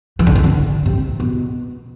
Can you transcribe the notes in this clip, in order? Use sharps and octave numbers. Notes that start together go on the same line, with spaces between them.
E3
D3
C3
D3
C3
B2